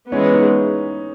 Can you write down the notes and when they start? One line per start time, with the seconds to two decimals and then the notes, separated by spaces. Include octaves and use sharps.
0.12 E3 G#3 B3 C#4
0.34 D#4